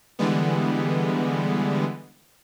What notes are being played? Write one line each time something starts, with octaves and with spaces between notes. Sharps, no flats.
D3 E3 G3 G#3 B3